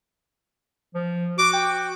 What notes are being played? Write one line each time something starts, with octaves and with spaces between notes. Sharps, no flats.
F3
F#4 D6
G5